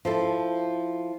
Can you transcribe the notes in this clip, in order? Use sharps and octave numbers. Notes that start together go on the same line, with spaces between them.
F3 E4 A4